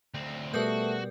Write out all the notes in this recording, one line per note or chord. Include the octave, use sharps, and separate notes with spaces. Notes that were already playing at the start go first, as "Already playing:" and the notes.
D2 C4
B2 G3 A3 F#4 A#4 B4 G6